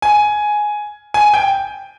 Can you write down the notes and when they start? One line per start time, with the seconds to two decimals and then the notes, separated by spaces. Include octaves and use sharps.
0.02 G#5
1.14 G#5
1.34 G5